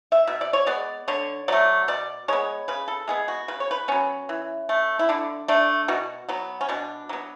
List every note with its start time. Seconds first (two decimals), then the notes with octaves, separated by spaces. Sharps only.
0.12 E5
0.27 B2 E5
0.41 D5
0.53 C#5
0.67 G#3 B3 D5
1.08 D3 C#5
1.48 F#3 A3 D5
1.88 B2 D5
2.28 G#3 B3 C#5
2.68 C#3 B4
2.88 A4
3.08 G#3 B3 G#4
3.28 F#4
3.48 C#3 B4
3.60 C#5
3.71 B4
3.88 F#3 B3 C#4
4.29 E3
4.69 A3
4.99 E4
5.09 D3 D4
5.48 A3 D4
5.88 B2 F#4
6.29 F#3 B3
6.61 C#4
6.69 B2 D4
7.09 F#3 B3